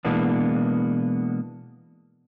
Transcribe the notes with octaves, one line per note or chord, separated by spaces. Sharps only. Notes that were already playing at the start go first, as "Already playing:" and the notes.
B2 E3 G#3 A#3 B3 D4